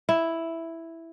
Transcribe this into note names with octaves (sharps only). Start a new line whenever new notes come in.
E4